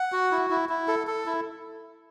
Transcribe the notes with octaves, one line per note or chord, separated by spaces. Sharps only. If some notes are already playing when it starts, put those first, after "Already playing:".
Already playing: F#5
F#4
E4
E4
E4
A4
A4
E4